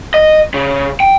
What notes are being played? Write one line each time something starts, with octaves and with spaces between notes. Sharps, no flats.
D#5
C#3
G5